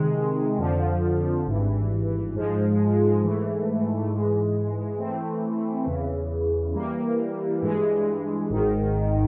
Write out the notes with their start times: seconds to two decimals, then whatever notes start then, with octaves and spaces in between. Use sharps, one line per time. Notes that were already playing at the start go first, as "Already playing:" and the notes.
Already playing: C3 D#3 G#3
0.58 F2 D3 F3
1.46 G#1 G2 E3
2.34 G#2 F3 G#3
3.22 G#2 E3 A3
4.10 G#2 E3 G#3
4.98 E3 A3 C4
5.85 E2 C#3 E3
6.74 E3 G3 A#3
7.62 G2 E3 G#3
8.50 G#1 G#2 D#3